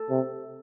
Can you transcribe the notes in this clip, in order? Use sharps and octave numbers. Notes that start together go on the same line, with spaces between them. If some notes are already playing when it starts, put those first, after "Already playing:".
Already playing: A4
C3